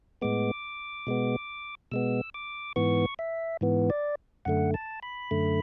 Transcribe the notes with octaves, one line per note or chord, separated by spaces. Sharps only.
A2 G#3 B3 D6
B2 G#3 B3
B2 G#3 B3 E6
D6
G#2 E3 B3 C#6
E5
G#2 E3 B3
D5
F#2 D3 A3 F#5
A5
B5
F#2 D3 A3